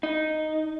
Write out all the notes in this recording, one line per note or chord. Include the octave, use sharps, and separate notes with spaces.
D#4